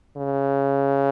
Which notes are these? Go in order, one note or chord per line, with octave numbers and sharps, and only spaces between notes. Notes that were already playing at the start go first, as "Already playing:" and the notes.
C#3